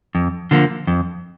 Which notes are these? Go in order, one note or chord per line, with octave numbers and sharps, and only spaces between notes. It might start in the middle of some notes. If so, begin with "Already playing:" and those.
F2
D3 F3 A#3
F2